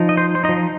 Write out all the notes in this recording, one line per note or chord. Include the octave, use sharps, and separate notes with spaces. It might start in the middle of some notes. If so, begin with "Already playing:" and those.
Already playing: F3 D#4
D#5
C5
C5
D#4 D#5
F3